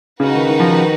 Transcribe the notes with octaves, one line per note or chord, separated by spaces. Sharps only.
C#3 D#4 F#4 B4
D#3
D#3
F3
D#3